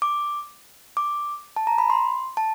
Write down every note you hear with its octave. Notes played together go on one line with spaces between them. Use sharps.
D6
D6
A5
A#5
B5
C6
A5